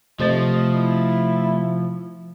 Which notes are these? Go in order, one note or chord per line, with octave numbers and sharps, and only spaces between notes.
C3 F3 A3 C5 D#5 A6
E4